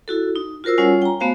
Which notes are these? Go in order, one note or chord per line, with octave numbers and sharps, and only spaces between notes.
E4 F#4 A4
D#4
F4 F#4 A#4 C5 E6
G3 C#4 F4 C#5 F#5 G#5
G5 A#5
A3 B3 F#4 C5 F5 G#5